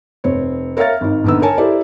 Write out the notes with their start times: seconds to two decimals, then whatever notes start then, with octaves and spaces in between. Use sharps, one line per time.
0.24 F1 C4 C#5
0.77 A#4 C#5 E5 F5 F6 A6
1.01 G#1 D#3
1.24 A#1 D3 B3 D#4 E6
1.42 A#4 C#5 G#5 A5
1.58 E4 G4 A4 A#4 C5 D5